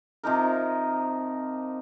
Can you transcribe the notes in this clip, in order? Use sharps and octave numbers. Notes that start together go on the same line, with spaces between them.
C3 F3 D#4 A#4